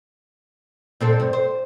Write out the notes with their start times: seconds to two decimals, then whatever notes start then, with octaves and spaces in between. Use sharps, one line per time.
1.00 A#2 C4 A4
1.20 G2
1.33 C5